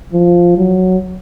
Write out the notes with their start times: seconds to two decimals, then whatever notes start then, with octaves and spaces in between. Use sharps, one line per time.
0.13 F3
0.57 F#3